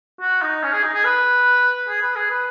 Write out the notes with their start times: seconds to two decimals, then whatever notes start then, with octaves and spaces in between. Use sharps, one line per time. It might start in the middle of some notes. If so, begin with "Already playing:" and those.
0.21 F#4
0.42 D#4
0.63 C#4
0.73 G#4
0.84 D#4
0.94 G#4
1.04 B4
1.89 G#4
2.02 B4
2.16 G#4
2.31 B4